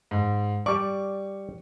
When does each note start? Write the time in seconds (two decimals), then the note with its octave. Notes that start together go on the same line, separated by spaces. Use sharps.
0.11 G#2
0.66 G3 D5 C#6